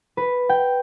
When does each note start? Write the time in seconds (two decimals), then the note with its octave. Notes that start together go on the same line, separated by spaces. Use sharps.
0.17 B4
0.49 G5